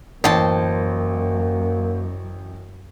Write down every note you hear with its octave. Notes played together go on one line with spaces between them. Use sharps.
A1 F#2 A#3 C5 G5 A5